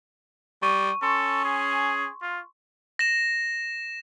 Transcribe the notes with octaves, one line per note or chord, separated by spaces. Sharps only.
G3 C#6 D#7
C#4 A4 C6 C#6
G#4
F4
A#6 E7